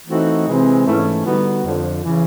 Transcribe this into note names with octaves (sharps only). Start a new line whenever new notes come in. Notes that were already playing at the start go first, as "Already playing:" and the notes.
E3 A3 C4 D#4 F#4
C3 E3 G#3 C4
G#2 E3 A3 C#4 E4
D3 G3 B3 D#4 F#4
F2 D3 F3
C#3 E3